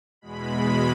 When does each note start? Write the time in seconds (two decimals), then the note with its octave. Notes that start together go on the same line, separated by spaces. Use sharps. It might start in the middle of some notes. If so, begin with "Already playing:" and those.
0.21 E2 B2 G#3 B5